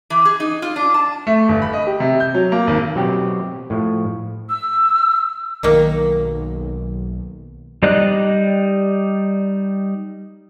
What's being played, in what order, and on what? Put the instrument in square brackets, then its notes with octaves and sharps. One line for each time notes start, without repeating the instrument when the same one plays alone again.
[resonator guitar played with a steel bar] E3
G#4
D#4
F4
D4
A5
[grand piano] A3
G1
B5
D#5
G4
C3
G6
F#3
A#3
G#1
[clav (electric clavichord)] B2 F#3 C4 G4
A2 F3
[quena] E6
[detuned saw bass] B1 [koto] D#3 A#3
[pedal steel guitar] G3 D#4 D5 D#5 F#6